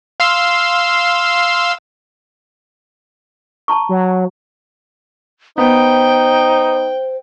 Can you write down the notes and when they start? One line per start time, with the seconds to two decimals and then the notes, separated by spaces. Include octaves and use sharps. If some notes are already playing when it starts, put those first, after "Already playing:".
0.20 F5 C6 E6
3.68 A5 A#5 C#6
3.89 F#3
5.58 B3 D#4 C5 G5